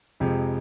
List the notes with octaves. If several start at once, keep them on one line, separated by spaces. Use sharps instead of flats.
F2 C3 F3 G#3